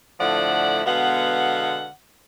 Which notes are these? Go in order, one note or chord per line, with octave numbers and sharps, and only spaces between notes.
A2 D3 F3 D5 E5 F#5
B2 D3 G#3 B3 F5 F#5